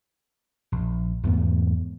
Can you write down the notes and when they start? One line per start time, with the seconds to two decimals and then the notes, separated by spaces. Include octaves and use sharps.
0.72 A#1
1.23 E2 G#2 A3 B3